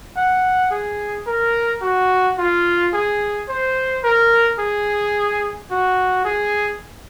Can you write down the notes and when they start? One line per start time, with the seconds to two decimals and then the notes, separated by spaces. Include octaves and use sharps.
0.16 F#5
0.71 G#4
1.27 A#4
1.82 F#4
2.38 F4
2.93 G#4
3.49 C5
4.04 A#4
4.59 G#4
5.71 F#4
6.25 G#4